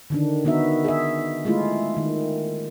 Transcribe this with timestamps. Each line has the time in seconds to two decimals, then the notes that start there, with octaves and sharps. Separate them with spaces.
0.10 D3 D#3 D4
0.45 D#3 B3 D#4 F#4 E5
0.85 G#4 E5
1.45 G#3 A3 E4 F4
1.97 D#3